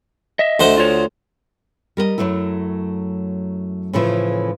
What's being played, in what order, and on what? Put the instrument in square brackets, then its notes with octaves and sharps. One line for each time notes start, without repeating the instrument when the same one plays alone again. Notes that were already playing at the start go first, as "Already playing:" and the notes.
[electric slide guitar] D#5 E5
[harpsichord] D2 C5 F#5
[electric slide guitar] F4 C#5
[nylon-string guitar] G3 A#4 B4 D#5
F#2 D3 F#3 A3 E4
A2 C#3 E3 F3 A3